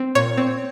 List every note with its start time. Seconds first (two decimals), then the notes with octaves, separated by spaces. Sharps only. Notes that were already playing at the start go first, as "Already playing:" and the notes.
Already playing: C4
0.15 A#2 C#5
0.37 C4